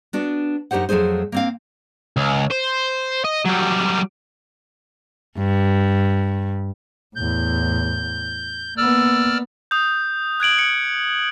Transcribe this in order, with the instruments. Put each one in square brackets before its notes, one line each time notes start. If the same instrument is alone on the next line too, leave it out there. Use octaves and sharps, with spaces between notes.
[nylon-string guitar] B3 D4 F#4
F#2 D#4 G4 C5 F#5
F2 F#3 A3 G#4 C5
A#3 C4 F5
[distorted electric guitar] C#2
C5
D#5
F#3 G3
[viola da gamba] G2
[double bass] E2 A2 [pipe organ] G6
[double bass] A#3 B3 [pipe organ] D5 E6 F6
[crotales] D#6 G6
F#6 G#6 D7 F#7
C#7